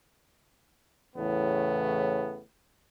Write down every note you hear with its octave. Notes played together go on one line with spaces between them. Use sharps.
E2 A2 C#3 B3